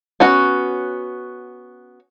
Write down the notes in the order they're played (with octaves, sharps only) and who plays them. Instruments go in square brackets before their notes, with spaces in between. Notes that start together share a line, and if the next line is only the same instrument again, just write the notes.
[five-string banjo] B3 C#4 F#4